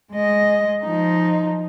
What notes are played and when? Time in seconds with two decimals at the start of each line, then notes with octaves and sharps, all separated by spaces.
0.13 G#3 D#5
0.84 F3 D#4